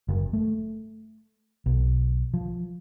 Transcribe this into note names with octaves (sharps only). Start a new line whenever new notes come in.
F#1
A3
B1
F3